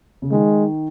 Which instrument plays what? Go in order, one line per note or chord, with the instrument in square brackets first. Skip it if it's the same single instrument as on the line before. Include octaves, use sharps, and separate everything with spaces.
[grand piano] C#3
[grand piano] D#3 [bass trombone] G#3